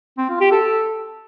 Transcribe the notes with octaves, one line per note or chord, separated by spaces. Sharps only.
C4
F4
G4
A4